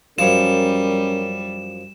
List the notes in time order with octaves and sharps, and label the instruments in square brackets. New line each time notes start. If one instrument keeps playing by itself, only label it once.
[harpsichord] F#2 F3 F4 [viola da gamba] G3 [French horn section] C#4 A#4 [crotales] E7